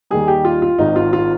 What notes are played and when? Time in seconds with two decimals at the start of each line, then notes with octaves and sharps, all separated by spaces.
0.10 D#2 D#3 G3 G#4
0.28 G4
0.45 F4
0.62 F4
0.78 G#1 G#2 D#3 D#4
0.96 F4
1.13 F4